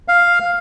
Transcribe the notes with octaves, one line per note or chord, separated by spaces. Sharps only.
F5